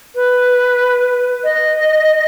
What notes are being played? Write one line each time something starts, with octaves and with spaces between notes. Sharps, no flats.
B4
D#5